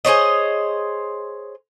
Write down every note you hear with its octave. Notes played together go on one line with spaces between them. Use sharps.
G#4 C5 C#5 D#5